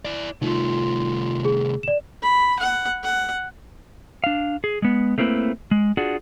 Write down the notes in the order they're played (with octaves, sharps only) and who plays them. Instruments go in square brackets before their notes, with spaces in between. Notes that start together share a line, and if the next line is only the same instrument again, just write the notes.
[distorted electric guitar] E4 D5
[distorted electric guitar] C2 A3 [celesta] D#4 [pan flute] F4
[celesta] G#4
D5 E7
[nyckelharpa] B5
F#5
F#5
[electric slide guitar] D4 F5
G#4
G#3 B3
A3 A#3 C4 E4 B4
G#3
D4 F4 F#4 G#4